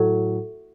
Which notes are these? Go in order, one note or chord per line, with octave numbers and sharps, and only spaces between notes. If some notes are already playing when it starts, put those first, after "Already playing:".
Already playing: A2 F#3